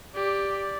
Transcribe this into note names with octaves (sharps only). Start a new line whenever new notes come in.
G4 D5